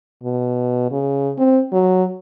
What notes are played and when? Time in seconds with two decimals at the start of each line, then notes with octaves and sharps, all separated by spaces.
0.23 B2
0.91 C#3
1.38 C4
1.73 F#3